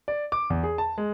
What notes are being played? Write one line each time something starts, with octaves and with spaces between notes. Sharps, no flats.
D5
D6
E2
G#4
A5
G#3